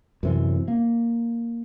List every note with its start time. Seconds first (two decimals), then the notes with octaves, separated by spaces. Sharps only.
0.23 F#2 C3 E3
0.68 A#3